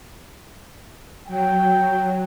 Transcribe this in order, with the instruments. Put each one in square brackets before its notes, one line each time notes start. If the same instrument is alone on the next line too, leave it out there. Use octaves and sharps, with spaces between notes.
[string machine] F#3 [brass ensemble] G5